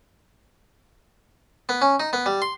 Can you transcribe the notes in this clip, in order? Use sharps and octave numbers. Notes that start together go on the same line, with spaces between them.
B3
C#4
D#4
B3
G3
C6